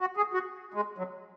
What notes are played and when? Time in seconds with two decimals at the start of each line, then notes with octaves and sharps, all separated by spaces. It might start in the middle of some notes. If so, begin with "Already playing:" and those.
0.01 F#4
0.17 G#4
0.34 F#4
0.74 G#3
0.98 F#3